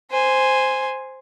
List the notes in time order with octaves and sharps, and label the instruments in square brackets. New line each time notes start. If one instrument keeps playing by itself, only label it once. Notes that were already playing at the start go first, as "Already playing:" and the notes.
[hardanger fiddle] C5 G#5